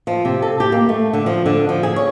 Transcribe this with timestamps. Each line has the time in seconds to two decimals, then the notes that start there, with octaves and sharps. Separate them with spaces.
0.07 F3
0.25 C3
0.42 A4
0.60 G4
0.72 A#3
0.89 A3
1.13 D3
1.26 F3
1.46 D3
1.69 F3
1.83 G#4
1.96 C#5